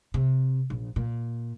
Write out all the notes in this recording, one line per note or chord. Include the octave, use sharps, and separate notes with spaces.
C3
A#1
A#2